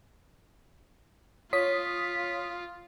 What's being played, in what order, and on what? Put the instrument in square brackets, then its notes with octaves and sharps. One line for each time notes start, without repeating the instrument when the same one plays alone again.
[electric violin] F4 [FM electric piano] C#5 D#6 B6